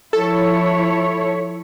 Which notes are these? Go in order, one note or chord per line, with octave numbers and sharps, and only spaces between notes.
F3 E4 A4 C#5